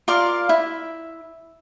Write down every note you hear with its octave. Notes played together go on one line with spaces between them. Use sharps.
F4 A#4 D5 F5
E4